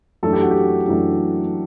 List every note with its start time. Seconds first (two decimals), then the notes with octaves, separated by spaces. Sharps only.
0.23 F#2 E3 A3 D4 A4
0.33 G4
0.43 F#4
0.51 G4
0.88 F#2 E3 A3 D4